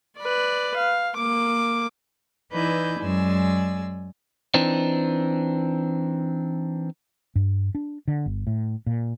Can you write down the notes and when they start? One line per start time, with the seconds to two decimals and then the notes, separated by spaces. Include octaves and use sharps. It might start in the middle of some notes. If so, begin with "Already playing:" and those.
0.20 B4 D5
0.78 F5
1.18 A#3 D6
2.52 E3 D#4 E4 B4 D5 G6
3.00 F#2 G#3 D5 G#5 E6
4.54 E3 C4 D4 D#4
7.36 G2
7.75 D4
8.08 D3
8.26 G1
8.47 A2
8.86 A#2